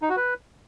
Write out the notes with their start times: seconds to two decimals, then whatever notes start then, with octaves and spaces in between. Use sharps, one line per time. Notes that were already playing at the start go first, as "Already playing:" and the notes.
0.02 D#4
0.09 F#4
0.17 B4